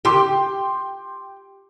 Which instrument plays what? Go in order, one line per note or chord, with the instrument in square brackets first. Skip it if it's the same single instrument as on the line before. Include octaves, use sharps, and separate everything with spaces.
[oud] G4 [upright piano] G5 C6 D6